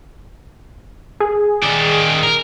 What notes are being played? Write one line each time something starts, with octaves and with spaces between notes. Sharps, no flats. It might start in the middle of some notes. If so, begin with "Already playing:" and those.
G#4
D#3 D5
A#4